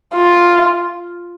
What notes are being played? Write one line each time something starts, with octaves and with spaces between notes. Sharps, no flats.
F4